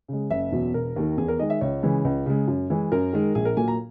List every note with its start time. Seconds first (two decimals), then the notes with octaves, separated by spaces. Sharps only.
0.08 C#3 G#3
0.30 F#1 E5
0.52 E2 B2 F#3
0.74 E1 A#4
0.96 D#2 D#3
1.18 E2 G#4
1.28 A#4
1.39 D#3 G#3 D#5
1.50 E5
1.61 C#2 C#5
1.83 C#3 E3 G#3
2.05 C#2
2.26 C#3 G#3
2.48 F#2
2.70 E3 G#3
2.92 F#2 A#4
3.13 D#3 G#3
3.35 A#1 G#4
3.45 A#4
3.57 A#2 F#3 A#3 G#5
3.68 A#5